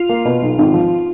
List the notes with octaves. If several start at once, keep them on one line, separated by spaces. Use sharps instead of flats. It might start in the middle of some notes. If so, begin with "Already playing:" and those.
Already playing: F4
A#3
B2
B1
G#1
F3